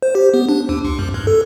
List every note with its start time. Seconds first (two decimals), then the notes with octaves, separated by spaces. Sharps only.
0.02 C5
0.15 G4
0.34 B3
0.49 D4
0.69 D#2
0.84 C#2
0.99 F#2
1.14 G2
1.27 A4